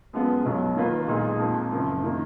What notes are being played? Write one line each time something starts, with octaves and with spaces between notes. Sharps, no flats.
F#2 F3 G#3 B3 F4
B1 B2 F#3
D#3 A#3 F4 B4
B1 A#2 G#3 D#4 G#4
F2 F3 A#3
F#1 F#2 F3
D#3 A#3